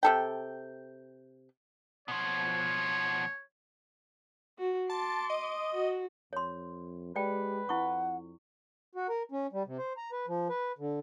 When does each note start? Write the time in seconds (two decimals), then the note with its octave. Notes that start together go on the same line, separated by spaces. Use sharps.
0.03 C3 A4 G5
2.08 B2 F3 C#5
4.59 F#4
4.90 A5 C6 D6
5.30 D#5
5.72 F#4
6.33 F2 C#5 C6
7.16 G#3 G4 B4 D5 G5
7.69 F2 E4 F#5 C#6
8.95 F#4
9.09 A#4
9.32 C#4
9.52 G3
9.66 C3
9.78 C5
9.97 A#5
10.12 B4
10.28 F3
10.50 B4
10.78 D3